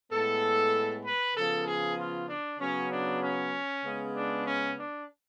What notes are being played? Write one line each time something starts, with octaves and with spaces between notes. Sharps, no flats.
A2 G#3 B3 A4
B4
C#3 F3 B3 A4
G#4
F4
D4
C#3 F#3 B3 C#4
D4
C#4
C#3 G#3 B3
D4
C#4
D4